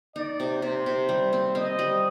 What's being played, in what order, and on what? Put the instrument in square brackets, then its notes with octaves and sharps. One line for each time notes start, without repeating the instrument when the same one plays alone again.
[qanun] D#4 [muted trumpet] D5
[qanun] C3
[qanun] C3 [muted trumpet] C5
[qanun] C3
G3
C4
[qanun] C4 [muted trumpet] D#5
[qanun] G3